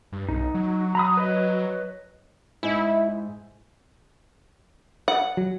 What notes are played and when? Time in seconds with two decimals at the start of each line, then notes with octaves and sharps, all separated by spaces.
0.12 G2
0.29 B1 D#4
0.54 F#3
0.95 F#3 A#5 B5 D#6
1.17 B4 C#5 D#5
2.63 G#2 D#4 E4
5.08 F#5
5.37 F#3